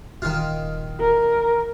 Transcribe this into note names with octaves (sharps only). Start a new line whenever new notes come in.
D#1 D#3 F4
A#4